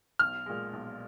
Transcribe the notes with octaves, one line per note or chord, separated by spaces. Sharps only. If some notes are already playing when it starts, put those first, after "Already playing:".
B1 F6
A#2 G#3
B1